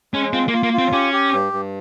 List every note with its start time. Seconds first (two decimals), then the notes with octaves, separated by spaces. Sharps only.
0.14 G#3 C#4
0.33 C4 F4
0.48 A#3
0.53 F4
0.63 A#3
0.74 C4 F4
0.92 C#4 G4
1.13 G4
1.33 G2
1.53 G2